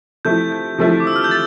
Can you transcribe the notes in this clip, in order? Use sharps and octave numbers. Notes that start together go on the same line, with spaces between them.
C3 F3 A3 E4 G6
G6
C3 F3 A3 E4
D6
E6
F6
G6
A6